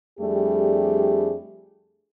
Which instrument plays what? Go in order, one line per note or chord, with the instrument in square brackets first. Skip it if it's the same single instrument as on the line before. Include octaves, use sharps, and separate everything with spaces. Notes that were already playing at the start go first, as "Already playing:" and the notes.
[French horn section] F2 G3 A3 D4 G4 G#4